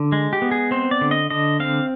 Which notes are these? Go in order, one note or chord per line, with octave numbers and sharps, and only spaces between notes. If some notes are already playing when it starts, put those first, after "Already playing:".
Already playing: D3
G#3
G4
B3
G#4
C4 C5
D5
D3
D#5
D3 D#5
C4 F5